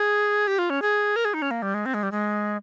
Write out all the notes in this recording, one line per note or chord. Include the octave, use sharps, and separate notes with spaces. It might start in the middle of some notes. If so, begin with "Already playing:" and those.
Already playing: G#4
G4
F4
C#4
G#4
A#4
G#4
D#4
C#4
A#3
G3
G#3
C4
G#3
G3
G#3